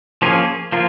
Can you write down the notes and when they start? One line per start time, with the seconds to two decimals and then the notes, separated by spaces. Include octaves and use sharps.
0.22 F3 A#3 C#4 F4 G#4
0.72 F3 A#3 F4